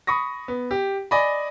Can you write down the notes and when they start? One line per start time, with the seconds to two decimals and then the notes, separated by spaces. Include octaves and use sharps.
0.07 B5 C#6 D#6 A#6
0.48 B3
0.71 G4
1.11 D5 D#5 G#5 B5